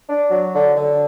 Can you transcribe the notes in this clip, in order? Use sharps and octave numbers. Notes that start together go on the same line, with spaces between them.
D4
F#3
D3
D3